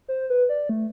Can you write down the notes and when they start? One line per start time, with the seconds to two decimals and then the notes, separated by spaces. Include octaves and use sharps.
0.08 C5
0.30 B4
0.49 D5
0.69 A3